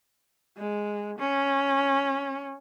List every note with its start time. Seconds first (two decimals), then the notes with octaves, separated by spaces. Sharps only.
0.57 G#3
1.18 C#4